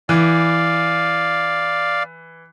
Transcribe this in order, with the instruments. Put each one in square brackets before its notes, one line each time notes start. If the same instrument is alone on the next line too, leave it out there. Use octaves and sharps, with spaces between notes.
[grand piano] E3 [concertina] D5 F5